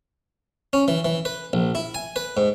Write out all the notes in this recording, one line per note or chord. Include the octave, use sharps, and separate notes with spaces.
C#4
E3
E3
B4
A#1
E4
G#5
B4
G#2